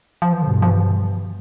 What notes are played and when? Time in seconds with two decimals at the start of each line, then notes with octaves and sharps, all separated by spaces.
0.22 F3
0.33 E3
0.41 G2 B2 D3
0.62 F3
0.70 E3